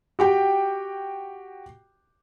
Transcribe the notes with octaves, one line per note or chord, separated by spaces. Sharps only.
F#4 G4 G5